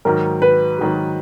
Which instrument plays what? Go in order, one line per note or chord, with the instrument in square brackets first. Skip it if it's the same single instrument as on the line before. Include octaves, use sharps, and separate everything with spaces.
[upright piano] G#2 D#3 F#3 [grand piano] A#4
[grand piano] B4
[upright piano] G#2 D#3 F#3